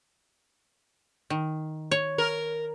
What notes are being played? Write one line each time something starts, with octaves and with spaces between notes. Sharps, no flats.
D#3
C#5
A#4